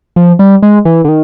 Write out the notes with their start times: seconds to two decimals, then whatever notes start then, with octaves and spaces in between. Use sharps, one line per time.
0.16 F3
0.39 G3
0.62 G#3
0.85 E3
1.04 D3
1.09 D#3